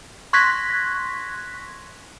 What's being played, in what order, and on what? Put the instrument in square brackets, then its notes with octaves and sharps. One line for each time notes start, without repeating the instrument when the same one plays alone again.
[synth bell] C6 C#6 F#6 G#6 A#6 B6